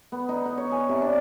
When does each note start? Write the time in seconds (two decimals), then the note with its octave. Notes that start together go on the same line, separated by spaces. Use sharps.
0.12 B3
0.29 D#4
0.45 F#5
0.57 C#5
0.71 G#5
0.89 C3
1.02 D4